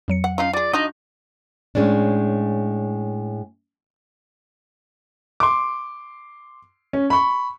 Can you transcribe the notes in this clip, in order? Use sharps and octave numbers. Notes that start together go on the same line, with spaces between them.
F2 F#3 C#7
F#5
C#4 D#4 F4 F5
F4 G#4 D5
D4 D#4 F4 F#4 D#5
A2 G#3 C#4 D4
C6 D6
C#4
B5 C#6